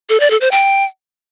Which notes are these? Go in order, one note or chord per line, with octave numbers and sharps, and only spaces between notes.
A4
D5
A4
C5
G5